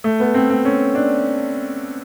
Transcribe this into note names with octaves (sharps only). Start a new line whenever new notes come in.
A3
B3
C4
C4
C#4
D4